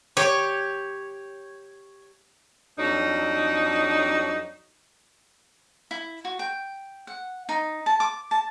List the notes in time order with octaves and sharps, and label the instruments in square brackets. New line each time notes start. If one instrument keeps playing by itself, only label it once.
[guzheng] G4 [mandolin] C#5
[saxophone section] F2 F#3 D4 D#4
[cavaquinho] E4
F#4
G5
F#5
D#4
A5
D6
A5